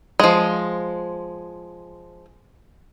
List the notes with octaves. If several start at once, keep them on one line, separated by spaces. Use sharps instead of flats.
F3 G#3